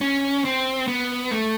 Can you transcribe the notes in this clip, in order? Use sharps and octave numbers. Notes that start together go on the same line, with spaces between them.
C#4
C4
B3
A3